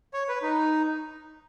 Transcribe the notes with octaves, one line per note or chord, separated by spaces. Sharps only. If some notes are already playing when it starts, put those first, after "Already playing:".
C#5
B4
D#4